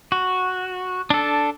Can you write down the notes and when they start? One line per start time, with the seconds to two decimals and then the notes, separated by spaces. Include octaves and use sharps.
0.12 F#4
1.10 D4 A4